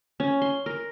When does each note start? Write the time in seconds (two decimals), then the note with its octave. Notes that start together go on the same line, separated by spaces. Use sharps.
0.20 C#4
0.42 C6
0.66 A#4